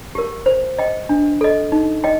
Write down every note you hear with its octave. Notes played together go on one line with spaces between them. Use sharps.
G4 A#4
C5
D#5 G5
D4
A4 D#5
D#4
D#5 G5